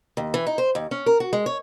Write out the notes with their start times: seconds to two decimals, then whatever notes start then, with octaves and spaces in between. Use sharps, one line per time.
0.17 D#2
0.34 E3
0.47 D#4
0.58 C5
0.75 D#2
0.91 C#4
1.06 A#4
1.20 F#4
1.33 G#3
1.46 C#5